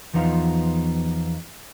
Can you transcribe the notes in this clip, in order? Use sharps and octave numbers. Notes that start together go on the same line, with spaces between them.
E2 F3 B3 D#4 F4